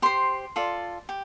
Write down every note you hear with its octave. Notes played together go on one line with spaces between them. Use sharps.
G4 C5 C6
F4 A4 D5
G4